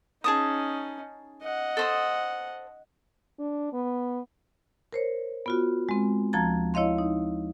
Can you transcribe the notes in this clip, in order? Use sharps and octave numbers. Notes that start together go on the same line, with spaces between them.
C#4 D#4 G#4 A5 D#6
D#5 F#5
A4 C5 D#6
D4
B3
A#4 C5 C#5
B3 F4 F#4
G#3 C4
D2 F3 A5 A#5 G#6 A6
E4 C#5 D#5 F5 C6
D#4